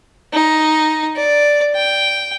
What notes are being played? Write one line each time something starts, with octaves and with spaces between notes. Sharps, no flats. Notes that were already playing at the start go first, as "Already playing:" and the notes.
D#4
D5
G5